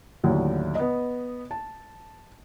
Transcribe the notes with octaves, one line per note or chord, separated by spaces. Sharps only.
D#2 A2 D3 F#3
B3 D#5
A5